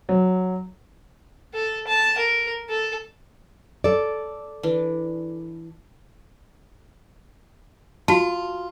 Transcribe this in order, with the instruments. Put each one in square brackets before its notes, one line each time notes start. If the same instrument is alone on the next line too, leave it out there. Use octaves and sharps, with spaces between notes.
[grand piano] F#3
[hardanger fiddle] A4
A5
A#4
A4
[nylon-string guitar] A4 D5
[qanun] E3 D4
[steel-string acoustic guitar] F4 [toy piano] F#4 A5